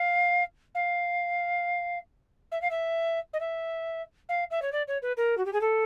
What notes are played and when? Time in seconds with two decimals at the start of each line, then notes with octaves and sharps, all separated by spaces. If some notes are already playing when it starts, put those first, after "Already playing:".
Already playing: F5
0.74 F5
2.51 E5
2.61 F5
2.70 E5
3.33 D#5
3.40 E5
4.29 F5
4.50 E5
4.62 C#5
4.72 D5
4.87 C#5
5.02 B4
5.17 A#4
5.37 F#4
5.45 G4
5.53 G#4
5.61 A4